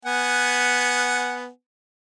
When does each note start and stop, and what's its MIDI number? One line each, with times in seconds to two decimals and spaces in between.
0.05 1.48 59
0.05 1.48 78
0.05 1.48 80